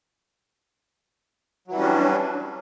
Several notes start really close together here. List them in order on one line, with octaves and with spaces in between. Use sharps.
F#3 E3 G3 C#4 D4